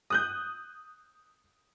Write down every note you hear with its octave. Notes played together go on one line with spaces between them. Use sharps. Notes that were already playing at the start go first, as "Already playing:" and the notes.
D#6 F#6 G6